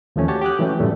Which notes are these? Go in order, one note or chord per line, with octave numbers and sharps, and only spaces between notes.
D#2 F3 A3 C#4
F#4 G4 C#5 A5
G4 F#5 D#6 F#6
E3 F#3 A3 C#4 G4
F#2 A2 D3 G3 A3